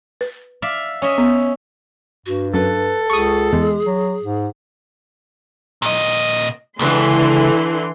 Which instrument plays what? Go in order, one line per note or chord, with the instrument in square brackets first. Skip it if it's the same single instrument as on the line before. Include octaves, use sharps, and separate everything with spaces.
[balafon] B4
[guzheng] D5 E5 F5
C#4 D#5 E5
[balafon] B3
[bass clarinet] G2 [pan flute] F#4
[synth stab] F#2 [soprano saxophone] A4 [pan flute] B4
[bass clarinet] C#2 [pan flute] G#4 [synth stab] C#6 D#6
[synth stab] E2 [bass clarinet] G#3
[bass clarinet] F#3
G#2
[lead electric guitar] A#2 D#5
[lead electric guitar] C#2 [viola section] D3 E3 C6